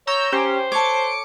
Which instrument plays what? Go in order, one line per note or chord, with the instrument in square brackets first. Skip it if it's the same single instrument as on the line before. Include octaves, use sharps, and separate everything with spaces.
[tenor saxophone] C#5 [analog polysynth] A#5 E6 G6
[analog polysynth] C#4 G4 [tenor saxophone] C5 [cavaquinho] A#5
[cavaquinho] A4 C#5 [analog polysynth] D6 C#7